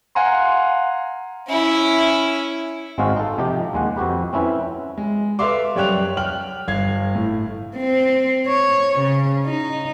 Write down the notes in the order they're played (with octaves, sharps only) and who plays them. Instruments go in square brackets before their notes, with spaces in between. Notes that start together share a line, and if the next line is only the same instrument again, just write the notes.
[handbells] F5 F#5 G#5 A#5 C6
[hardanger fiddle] C#4 E4
[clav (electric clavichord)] G#1 G#3 C4 D#4 F#4 F5
D#4 A4
C3 F3 D#4 G4
D#2 G#3 F#5
F2 F#4 G4 B4
C4 C#4 E4 B4
[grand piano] G#3
A4 B4 E5 F5 C6 D6
F#2 G3 C#5 G5 F#6 F7
G5 F6 F#7
G1 F5 G#6
A2
[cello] C4
C#5
C#3
D#4